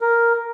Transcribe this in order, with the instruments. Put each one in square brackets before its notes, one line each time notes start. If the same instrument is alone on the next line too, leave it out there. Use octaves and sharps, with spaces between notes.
[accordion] A#4